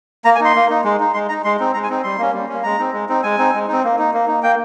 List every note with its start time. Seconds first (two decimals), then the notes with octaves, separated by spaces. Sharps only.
0.25 A#3 A#5
0.35 G#5
0.40 D#4 C6
0.55 A#3
0.69 D#4
0.84 G#3
1.00 D#4
1.14 G#3 C6
1.29 D#4 A#5
1.44 G#3 C6
1.59 C4 D#4
1.74 G#3 A#5
1.84 G#5
1.90 C4 D#4
2.04 G3 C6
2.19 A#3 C#4
2.34 G3
2.48 C#4
2.53 A#3
2.63 G#3 A#5
2.78 C4 D#4
2.93 G#3
3.09 C4 D#4
3.23 G#3 G#5
3.38 C4 D#4
3.54 G#3
3.68 C4 D#4
3.84 A#3
3.99 D#4
4.14 A#3
4.28 D#4
4.43 A#3 G5